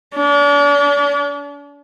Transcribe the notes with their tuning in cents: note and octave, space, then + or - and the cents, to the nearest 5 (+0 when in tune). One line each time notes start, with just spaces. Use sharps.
D4 -40